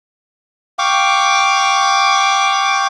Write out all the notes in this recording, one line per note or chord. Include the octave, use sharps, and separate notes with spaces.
F5 G5 C#6 D6